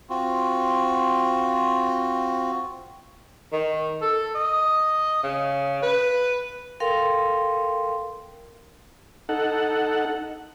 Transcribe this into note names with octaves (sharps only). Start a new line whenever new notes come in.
C4 F4 F#4
D#3
A4
D#5
C#3
B4
A4 A#4 F5 G5 C6
D#4 A4 F#5